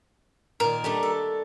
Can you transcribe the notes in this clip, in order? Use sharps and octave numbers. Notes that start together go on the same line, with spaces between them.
A#2 D#3 A#4
G3 A3 D4
A4